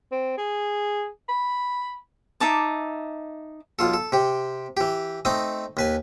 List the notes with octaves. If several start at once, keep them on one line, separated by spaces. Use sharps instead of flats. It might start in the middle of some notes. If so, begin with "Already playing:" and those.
C4
G#4
B5
D#4 E5 A5 D6
B1 F4 A4
A4
C3 G4
E3 G4
A3 C4 D#4 D#5
D#2 B4 G#5